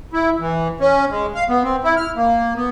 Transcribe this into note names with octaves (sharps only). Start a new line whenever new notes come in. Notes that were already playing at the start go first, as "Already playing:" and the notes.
E4
E3
C#4
G#3
F5
B3
C4
E4
F6
A#3
B3